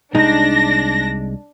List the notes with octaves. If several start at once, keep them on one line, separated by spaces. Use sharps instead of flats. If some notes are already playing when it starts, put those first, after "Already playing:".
C2 G#3 D4 D#4 A#6